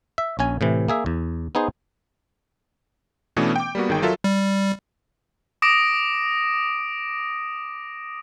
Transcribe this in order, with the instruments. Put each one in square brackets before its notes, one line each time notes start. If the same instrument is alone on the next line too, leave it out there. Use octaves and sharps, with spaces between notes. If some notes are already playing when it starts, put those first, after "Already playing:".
[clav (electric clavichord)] E5
A#1 C#4 G#5
A2 C3 E3
A#3 G#4 E5
E2
B3 D#4 G#4 C5
[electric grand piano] B2 E3 A3 B3 C#4 D4
G5 D6
G3 A#3 B3 F#4
G1 D#3 G#4 G5
F#3 F4 A4 A#4 E5
[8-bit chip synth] G3
[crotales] D6 D#6 A#6 D7